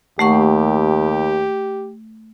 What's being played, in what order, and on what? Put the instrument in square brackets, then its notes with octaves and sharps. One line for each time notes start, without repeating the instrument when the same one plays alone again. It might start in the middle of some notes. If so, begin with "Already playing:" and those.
[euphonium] D#2 [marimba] A3 F#5 C#6 [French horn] G4